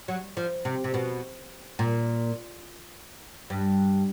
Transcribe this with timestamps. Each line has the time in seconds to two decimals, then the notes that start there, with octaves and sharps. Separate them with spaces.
0.08 F#3
0.37 F3
0.65 C3
0.84 C3
0.94 B2
1.79 A#2
3.50 G2